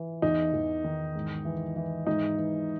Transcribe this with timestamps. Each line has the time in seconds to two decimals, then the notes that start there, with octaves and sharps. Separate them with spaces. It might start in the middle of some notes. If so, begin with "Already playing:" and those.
Already playing: E3
0.22 E2 D#4
0.53 E2
0.84 D#3
1.15 G#2
1.45 E3
1.76 E3
2.06 G#2 D#4
2.37 E3